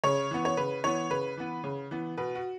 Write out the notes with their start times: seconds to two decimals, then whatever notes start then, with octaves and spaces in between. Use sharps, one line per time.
0.04 C#3 C#5
0.31 E3 B3
0.45 C#5
0.57 C#3 B4
0.84 E3 B3 C#5
1.10 C#3 B4
1.37 E3 B3
1.64 C#3
1.91 E3 B3
2.17 B2 B4
2.35 F#4